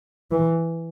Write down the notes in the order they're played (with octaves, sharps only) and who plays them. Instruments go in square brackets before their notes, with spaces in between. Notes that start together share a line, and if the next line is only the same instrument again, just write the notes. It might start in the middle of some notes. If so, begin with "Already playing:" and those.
[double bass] E3